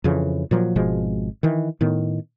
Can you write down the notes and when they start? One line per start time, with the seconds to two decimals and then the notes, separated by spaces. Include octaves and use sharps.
0.04 F2 C#3 E3
0.51 A#2 F3 F#3
0.76 G#1 B2 F3 G#3
1.43 D#3 E3
1.81 A2 D#3 B3